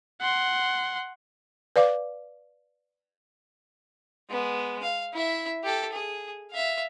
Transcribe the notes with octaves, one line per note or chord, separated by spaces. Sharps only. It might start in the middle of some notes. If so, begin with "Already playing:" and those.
F#5 C6
B4 D5 F5 D6
G#3 B3
F5
E4 E5
G4 A4
G#4
E5 F5